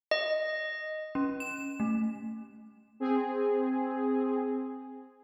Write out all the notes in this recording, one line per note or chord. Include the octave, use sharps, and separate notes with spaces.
D#5
C#4
E7
A3
C4 G#4